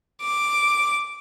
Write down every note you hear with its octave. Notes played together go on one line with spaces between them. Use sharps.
D6